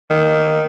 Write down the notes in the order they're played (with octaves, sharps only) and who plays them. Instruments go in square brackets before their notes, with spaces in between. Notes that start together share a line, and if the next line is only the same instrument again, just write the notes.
[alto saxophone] D#3